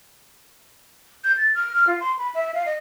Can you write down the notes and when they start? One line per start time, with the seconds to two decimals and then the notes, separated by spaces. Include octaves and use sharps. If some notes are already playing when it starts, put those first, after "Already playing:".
1.24 G6
1.37 A6
1.55 F6
1.75 F6
1.87 F4
2.00 C6
2.19 B5
2.35 E5
2.54 F5
2.66 D#5